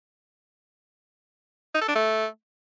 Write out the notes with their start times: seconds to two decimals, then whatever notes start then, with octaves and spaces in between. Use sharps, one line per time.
1.74 D#4
1.81 A4
1.88 D4
1.95 A3